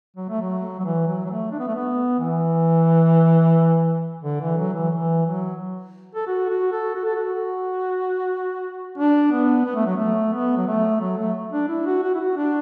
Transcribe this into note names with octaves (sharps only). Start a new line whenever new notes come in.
F#3
A3
F#3
F#3
E3
F#3
F#3
A3
D4
B3
A3
B3
E3
D3
E3
F#3
E3
E3
F#3
A4
F#4
F#4
A4
F#4
A4
F#4
D4
B3
B3
A3
F#3
A3
B3
F#3
A3
F#3
A3
D4
E4
F#4
F#4
E4
F#4
D4